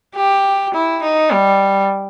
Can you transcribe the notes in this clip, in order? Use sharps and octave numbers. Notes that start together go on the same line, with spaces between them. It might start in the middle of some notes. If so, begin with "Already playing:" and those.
G4
E4
D#4
G3